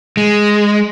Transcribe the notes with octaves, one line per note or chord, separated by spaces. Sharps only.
G#3